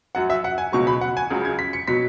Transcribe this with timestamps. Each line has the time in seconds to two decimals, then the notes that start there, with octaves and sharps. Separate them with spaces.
0.15 F#2 F#3 F#5
0.30 E5
0.44 F#5
0.58 G#5
0.72 C#2 B2 F#3 C#6
0.87 B5
1.01 F#5
1.17 G#5
1.30 C#2 C#3 F#3
1.45 G#6
1.59 B6
1.73 C#7
1.88 B2 F#3 B6